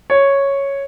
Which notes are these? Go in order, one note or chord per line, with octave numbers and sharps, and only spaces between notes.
C#5